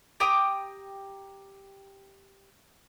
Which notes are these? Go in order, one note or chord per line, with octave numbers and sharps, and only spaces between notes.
G4 G5 A#5 D#6